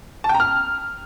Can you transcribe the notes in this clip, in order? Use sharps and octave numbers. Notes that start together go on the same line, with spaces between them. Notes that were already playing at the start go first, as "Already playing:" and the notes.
A5
G5
A#5
F6